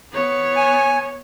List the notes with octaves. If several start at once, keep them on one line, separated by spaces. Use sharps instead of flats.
B3 C#5
G#5